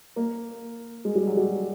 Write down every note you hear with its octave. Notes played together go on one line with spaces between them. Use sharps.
A#3
G#3
G3
F#3
G3